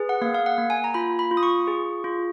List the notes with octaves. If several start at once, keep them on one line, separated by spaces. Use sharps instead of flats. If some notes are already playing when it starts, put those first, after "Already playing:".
Already playing: G#4 B4
F#5
A#3 F5
F5
F#5
A#3
G#5
A#5
F4 B5
B5
F4
D#6
C#6
G#4
F4